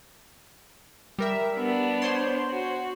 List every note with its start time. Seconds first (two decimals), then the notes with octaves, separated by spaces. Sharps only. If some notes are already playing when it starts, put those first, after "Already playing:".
1.19 G3 A#4 E5
1.57 B3 D4
2.02 C5 C#5 C6
2.49 F#4